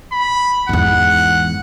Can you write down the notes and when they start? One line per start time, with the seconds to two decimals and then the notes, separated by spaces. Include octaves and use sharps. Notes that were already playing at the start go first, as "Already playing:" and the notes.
0.13 B5
0.69 E2 G#2 F#5